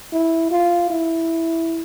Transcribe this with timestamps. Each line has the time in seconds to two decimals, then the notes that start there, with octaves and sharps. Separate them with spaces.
0.13 E4
0.51 F4
0.90 E4